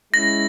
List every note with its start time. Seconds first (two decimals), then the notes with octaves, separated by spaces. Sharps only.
0.13 G#3 C#4 E4 A#6